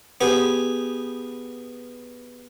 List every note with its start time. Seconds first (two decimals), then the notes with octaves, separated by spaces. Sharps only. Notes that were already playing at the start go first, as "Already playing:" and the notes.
0.21 B3 G4 G#4